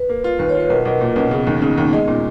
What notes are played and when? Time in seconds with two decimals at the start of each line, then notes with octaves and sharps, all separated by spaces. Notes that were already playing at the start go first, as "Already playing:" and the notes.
Already playing: B4
0.09 A#3
0.24 F4
0.39 D#2 B4
0.49 C#5
0.54 F4
0.60 B4
0.70 B1 A#4
0.85 B1
1.01 A#2 A#3
1.16 B1 C#4
1.31 C#3 B3
1.47 D#2 C#4
1.61 C#3 D#4
1.78 D#2
1.93 G#3
2.08 A#2